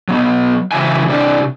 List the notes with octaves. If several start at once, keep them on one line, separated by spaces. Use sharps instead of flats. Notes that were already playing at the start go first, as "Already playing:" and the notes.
F#3 B3
C#3 E3 F#3 E5 G5 G#5
C3 D4 D5 G5